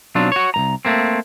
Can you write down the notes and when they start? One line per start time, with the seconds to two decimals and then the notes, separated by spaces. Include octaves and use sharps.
0.15 B1 F#3 C4 D4 F4
0.32 F#4 C#5
0.54 C2 G2 A#5
0.85 A3 A#3 C4